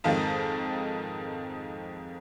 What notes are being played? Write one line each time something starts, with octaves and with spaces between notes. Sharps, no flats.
F2 G#2 D#3 F3